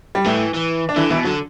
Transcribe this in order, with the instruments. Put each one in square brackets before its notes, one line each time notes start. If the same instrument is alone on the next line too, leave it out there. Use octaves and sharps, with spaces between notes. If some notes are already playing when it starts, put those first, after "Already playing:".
[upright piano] G3
[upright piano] A2 A3 [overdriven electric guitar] E3
[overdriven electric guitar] E3
[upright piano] D4
[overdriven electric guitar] D3 [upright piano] E3 E4
[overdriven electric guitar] B2 [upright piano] E3 E4
[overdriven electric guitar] D3 [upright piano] F#3